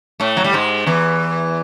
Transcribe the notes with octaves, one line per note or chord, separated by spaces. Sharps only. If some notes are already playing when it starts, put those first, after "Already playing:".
A2 A3
F#3
G3
G#2 G#3
E2 E3